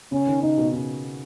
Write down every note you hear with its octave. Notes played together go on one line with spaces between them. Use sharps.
C#3 C#4
D#3
C#3 D#4
B2
C#3